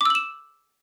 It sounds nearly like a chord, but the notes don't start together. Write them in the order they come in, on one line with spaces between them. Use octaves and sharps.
D6 E6 F#7 E7